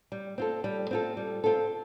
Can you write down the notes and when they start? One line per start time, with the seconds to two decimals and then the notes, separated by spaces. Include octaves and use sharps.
0.12 G3
0.38 C4 F4 A4
0.64 G3
0.91 C4 F4 A4
1.17 G3
1.44 C4 F4 A4